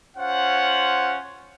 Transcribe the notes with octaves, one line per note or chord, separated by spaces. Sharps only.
C#4 F4 C5 F#5